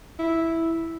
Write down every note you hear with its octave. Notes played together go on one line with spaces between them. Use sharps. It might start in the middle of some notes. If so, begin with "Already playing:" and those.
E4